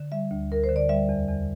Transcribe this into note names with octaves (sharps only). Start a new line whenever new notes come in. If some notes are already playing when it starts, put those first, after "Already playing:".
Already playing: D3
G3 E5
D2
D2 A#4
C5
D3
D5
G3 E5
E2
E2